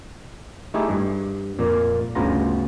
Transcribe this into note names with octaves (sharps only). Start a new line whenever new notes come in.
A3 D#4 E4 G4 G#4
G2
F2 A#2 A#3 D5
G1 D2 C#3 B3 F4 A#5